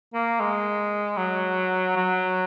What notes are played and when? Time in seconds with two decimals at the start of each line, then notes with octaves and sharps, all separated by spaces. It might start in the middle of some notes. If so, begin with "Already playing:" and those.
0.14 A#3
0.40 G#3
1.17 F#3
1.97 F#3